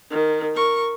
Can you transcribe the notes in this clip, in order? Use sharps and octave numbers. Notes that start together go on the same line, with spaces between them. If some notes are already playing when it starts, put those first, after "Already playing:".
D#3
A#4 C#6